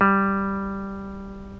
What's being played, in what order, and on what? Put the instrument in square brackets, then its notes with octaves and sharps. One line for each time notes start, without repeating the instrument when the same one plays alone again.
[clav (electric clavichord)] G3